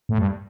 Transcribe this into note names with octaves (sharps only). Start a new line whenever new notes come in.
A2
G2